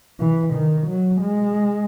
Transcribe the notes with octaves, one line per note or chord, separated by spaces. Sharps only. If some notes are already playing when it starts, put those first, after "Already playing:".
E3
D#3
F#3
G#3